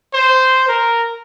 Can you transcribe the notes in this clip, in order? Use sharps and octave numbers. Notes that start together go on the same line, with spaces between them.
C5
A#4